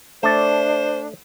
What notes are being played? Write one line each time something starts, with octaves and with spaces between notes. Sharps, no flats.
A3 D4 C5 D5